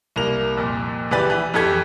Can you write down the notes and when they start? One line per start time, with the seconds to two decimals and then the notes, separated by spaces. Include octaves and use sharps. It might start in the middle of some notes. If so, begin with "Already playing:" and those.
0.16 C2 A#3 F7
0.57 F2 A#2
1.11 C#2 E3 G4 B4 D5 A6
1.30 E3
1.54 F2 E3 G4 A4 G#6